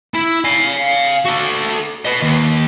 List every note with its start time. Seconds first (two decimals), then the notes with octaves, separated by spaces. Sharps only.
0.14 E4
0.44 F5 G#5
1.25 F#4 A4
2.05 B4 D#5
2.22 D#2